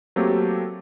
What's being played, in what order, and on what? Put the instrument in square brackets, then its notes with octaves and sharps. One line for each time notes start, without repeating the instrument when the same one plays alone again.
[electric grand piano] F#3 A3 A#3 C4 G4 A4